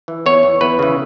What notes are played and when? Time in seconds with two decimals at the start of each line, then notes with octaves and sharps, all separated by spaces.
0.08 E3
0.26 E2 C#5
0.43 E3
0.61 E2 B4
0.79 C#3 E3